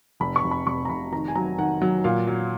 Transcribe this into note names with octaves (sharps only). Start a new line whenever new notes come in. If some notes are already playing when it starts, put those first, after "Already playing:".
F1 B5
C#6
F1
B5
F1 C#6
A#5
F1 B5
D#3 A#5
G#5
F#3 A#5
D#3 F#5
F#3
A#2 F5
F#3